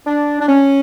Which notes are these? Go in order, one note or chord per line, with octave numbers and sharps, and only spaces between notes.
D4
D4
C#4